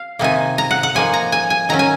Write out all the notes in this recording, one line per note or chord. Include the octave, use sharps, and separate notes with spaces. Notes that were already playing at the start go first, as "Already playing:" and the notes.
Already playing: F5
C3 D#3 A#3 D#4 G#5
A#5
F#5
F#5
F3 A#3 D#4 G#5
A#5
G#5
G#5
D#3 F#3 C#4 A#5
G#5